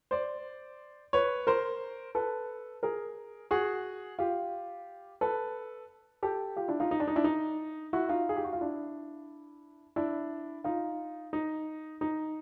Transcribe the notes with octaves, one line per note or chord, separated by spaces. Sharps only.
C5 D5
B4 C#5
A#4 C5
A4 B4
G#4 A#4
F#4 G#4
F4 G4
A4 B4
G4 A4
F4 G4
D4 E4
D#4 F4
D#4
D4
D#4
D4 E4
D#4
E4 F#4
D#4 F4
G#4
G4
F#4
F4
D4 E4
D4 E4
D#4 F4
D#4
D#4